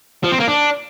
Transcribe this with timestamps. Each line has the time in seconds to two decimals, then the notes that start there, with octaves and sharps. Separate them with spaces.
0.24 F3
0.32 C4
0.40 A#3
0.49 D4